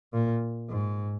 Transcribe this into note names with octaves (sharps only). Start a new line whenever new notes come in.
A#2
G#2